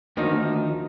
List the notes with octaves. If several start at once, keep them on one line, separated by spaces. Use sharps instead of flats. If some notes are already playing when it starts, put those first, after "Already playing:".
D2 D#3 F3 D#4